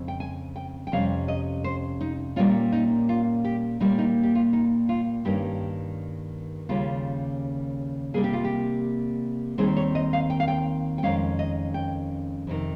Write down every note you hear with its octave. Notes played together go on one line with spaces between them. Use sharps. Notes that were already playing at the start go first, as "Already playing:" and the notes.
Already playing: F2 C#3 C4
G5
G#5
G5
G5
F2 C3 G3 C#4 F5
D#5
C5
D#4
A#2 G3 A#3 C#4 F4
D#4
F4
G4
A#2 G3 A#3 C#4 D#4
D#4
G4
F4
D#4
F4
G2 D#3 A#3 C#4 G4
D#2 C#3 G3 C#4 F4
C3 G3 A#3 G#4
G4
F4
G4
D#2 D#3 G3 C4 G#4
C#5
D#5
F5
G5
F5
G5
G5
F2 D#3 G#3 C#4 F5
D#5
G5
F2 C3 D#3